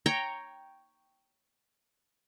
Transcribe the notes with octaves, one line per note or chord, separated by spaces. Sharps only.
C#5 G5 A#5